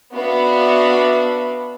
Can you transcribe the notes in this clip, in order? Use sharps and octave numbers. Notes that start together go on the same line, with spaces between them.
B3 D4 F#4 E5 F5 B5